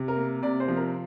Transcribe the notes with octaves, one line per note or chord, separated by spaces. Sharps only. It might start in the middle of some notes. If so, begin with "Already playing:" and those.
Already playing: C3
A#4
A#3
C3 D5
C5
F3
A#4